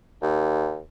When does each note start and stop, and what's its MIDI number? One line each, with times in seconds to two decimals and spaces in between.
0.22 0.80 39